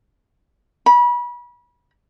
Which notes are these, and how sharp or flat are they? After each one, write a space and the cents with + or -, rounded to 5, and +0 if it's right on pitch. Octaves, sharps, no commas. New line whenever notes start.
B5 -30